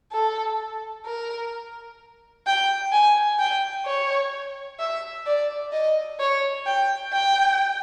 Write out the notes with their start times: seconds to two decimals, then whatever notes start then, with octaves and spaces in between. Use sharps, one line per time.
0.12 A4
1.06 A#4
2.46 G5
2.92 G#5
3.39 G5
3.86 C#5
4.79 E5
5.26 D5
5.73 D#5
6.20 C#5
6.66 G5
7.13 G5